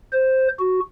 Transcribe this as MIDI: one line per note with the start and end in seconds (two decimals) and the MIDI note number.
0.13 0.48 72
0.59 0.80 66